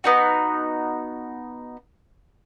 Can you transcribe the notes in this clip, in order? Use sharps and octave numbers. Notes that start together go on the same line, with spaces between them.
B3 D#4 F#4